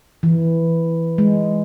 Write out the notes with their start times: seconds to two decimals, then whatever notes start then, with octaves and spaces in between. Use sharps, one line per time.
0.23 E3
1.18 G#3